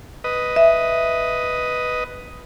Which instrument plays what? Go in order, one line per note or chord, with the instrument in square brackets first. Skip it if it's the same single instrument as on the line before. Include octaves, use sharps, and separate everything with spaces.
[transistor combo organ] B4 D#5
[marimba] E5